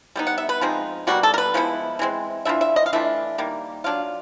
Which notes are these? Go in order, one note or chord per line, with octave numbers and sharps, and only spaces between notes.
G3 B3 D#4
F#5
E5
B4
F3 G#3 C4 D#4
B2 G3 A#3 F#4
A4
A#4
B4
F3 G#3 B3 E4
E3 G#3 C4
E3 A3 D4 F4 E5
E5
D#5
F5
E3 A3 D4 F4 E5
D#3 G3 A#3
F#3 A#3 D4 F4 F5